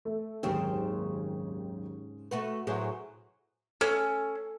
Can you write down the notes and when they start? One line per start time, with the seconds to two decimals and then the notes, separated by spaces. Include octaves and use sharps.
0.05 A3
0.43 F#1 D#2 G#2 C#3 C4
2.31 A3 F#4 B4
2.67 A2 F#3 G#4 B4 C5 F#5
3.81 C#4 A4